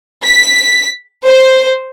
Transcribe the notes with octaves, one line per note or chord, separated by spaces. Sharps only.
B6
C5